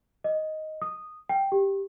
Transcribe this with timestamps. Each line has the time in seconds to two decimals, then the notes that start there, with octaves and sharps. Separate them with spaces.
0.24 D#5
0.82 D#6
1.29 G5
1.52 G4